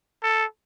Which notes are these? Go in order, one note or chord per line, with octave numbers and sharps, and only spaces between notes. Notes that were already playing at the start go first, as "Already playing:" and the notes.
A4